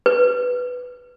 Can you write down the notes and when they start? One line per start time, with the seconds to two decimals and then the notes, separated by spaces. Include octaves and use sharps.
0.06 B4